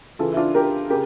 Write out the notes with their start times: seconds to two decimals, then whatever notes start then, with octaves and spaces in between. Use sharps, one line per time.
0.19 C#3 E3 F4 A4
0.33 E4
0.37 D4 F4
0.55 G4 A#4
0.90 C#3 G4 A#4